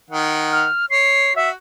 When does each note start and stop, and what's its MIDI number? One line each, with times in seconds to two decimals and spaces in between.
0.10 0.65 51
0.10 0.65 78
0.52 0.86 89
0.90 1.30 73
0.90 1.33 96
1.36 1.51 66
1.36 1.49 76